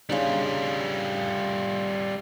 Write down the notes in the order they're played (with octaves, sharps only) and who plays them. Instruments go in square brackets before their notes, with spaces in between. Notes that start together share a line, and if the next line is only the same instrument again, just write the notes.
[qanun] C#3 D4 D#4 [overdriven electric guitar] G3 F4